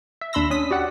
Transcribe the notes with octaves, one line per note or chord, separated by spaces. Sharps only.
E5
D#2 D4 B5 C6 E6 A#6
C#4 D4 D#6 B6
F#4 G4 D5 F#5